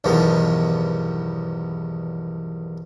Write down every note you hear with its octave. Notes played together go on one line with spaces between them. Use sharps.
B1 E2 G2 D#3 F3 B3